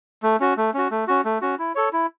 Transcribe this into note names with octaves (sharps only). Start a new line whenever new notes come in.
A3
C#4 F#4
A3
C#4 F#4
A3
C#4 F#4
A3
C#4 F#4
E4
A4 C#5
E4